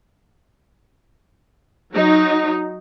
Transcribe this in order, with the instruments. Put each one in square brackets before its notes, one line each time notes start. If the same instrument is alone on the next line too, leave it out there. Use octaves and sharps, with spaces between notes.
[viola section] F#3 D#4